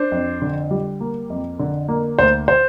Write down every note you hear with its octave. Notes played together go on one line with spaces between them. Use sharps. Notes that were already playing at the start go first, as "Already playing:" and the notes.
Already playing: D4 C5
F2
D3
G3
A#3
F2
D3
A#3
D2 C5
C5